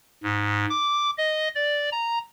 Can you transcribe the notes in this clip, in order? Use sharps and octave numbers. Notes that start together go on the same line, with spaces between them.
G#2
D6
D#5
D5
A#5